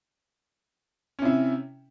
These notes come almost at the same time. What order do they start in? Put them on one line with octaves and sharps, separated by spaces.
C#4 C3 E4